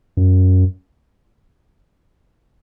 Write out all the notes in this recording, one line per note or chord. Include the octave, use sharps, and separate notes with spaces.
F#2